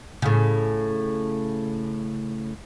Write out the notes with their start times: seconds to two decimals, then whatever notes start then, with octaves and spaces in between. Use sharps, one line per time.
0.22 A2 C#3